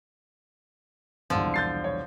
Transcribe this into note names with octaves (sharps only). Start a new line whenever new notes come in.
E1 C2 D3 F3
G6 A6 C7
C#5